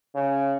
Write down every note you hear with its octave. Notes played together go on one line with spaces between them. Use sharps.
C#3